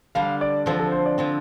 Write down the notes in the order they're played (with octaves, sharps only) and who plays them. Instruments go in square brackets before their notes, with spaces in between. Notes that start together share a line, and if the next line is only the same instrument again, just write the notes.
[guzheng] D3 G3 D4 [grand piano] F5
[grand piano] D5
[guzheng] D3 F3 C4 [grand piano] A4
[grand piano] A4
C5
D5
[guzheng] D3 F3 C4